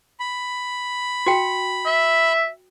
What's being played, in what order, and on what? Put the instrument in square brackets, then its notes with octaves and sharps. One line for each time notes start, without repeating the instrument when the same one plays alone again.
[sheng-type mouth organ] B5
[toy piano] F#4 G5
[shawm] E5